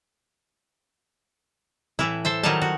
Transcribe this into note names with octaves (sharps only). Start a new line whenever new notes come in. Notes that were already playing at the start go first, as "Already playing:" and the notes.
A2 E3 E4
A4 C5 E5
D#3 F#3 G3 D#4 E4 A5
F#4